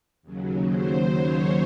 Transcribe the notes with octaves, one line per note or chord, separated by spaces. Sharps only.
D#2 C#3 F#3
C5
C#5